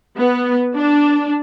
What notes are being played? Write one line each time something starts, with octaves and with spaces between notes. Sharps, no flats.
B3
D4